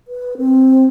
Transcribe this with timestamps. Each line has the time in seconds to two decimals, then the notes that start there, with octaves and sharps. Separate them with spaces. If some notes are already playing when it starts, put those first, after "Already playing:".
0.08 B4
0.38 C4